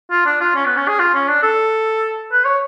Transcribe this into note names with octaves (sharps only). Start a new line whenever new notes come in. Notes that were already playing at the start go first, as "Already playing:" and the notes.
F4
D4
F4
C#4
B3
C#4
G#4
F4
C#4
D4
A4
B4
C#5